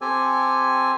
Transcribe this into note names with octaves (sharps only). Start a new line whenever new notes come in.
C4 G4 A4 G#5